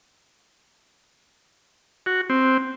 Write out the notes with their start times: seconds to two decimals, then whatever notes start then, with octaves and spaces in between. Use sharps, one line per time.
2.06 F#4
2.30 C4